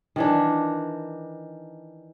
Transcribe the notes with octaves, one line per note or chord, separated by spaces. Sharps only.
D#3 E3 D4